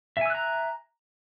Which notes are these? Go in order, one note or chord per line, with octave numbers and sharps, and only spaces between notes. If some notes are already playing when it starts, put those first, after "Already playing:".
E5 G#5 A#5 E6 F#6